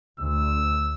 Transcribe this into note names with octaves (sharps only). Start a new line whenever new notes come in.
D2 E6